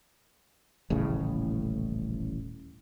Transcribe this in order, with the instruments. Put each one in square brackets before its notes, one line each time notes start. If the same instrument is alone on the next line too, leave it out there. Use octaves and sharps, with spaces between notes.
[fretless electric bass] D#1 A1 A2 C#3